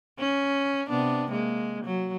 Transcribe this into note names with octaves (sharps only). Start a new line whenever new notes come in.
C#4
C3 B3 D4
G#3 A#3
F#3